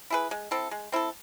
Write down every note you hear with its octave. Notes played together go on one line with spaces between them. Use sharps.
E4 G#4 B4
G#3
C4 E4 A4
G#3
C4 E4 A4